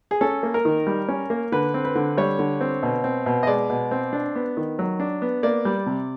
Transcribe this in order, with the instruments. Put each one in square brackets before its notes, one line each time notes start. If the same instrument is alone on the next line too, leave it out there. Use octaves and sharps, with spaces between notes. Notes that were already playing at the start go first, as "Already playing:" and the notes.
[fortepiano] G#4
C#4 A4
A#3
A#4
D#3
G3
C#4
A#3
D3 B4
C4
B4
D3
G3 C#5
D3
C4
B2
C4
B2
D#5
G#3 D5
B2
C4
D4
B3
D#3
F#3
D4
B3
A#3 D5
G3
C3